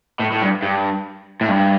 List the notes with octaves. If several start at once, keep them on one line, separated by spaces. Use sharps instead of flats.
A2
A2
G2
G2
A2
G2